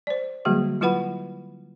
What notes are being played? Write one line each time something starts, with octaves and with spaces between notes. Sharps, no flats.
C5 D5
D3 F#3 G3 A#3 F#4 G#4
F#3 E4 F4 B4 F#5 B5